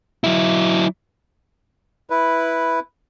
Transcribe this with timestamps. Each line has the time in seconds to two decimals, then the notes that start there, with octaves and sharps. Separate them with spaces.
0.24 F#3 E4
2.10 E4 B4